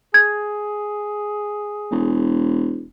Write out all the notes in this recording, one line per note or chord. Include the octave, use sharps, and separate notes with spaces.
G#4 G#6
E1